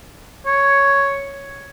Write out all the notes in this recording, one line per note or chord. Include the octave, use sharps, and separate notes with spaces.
C#5